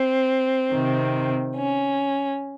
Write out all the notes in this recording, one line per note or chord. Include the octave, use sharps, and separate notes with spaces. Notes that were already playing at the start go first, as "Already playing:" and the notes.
Already playing: C4
C3 D#3
C#4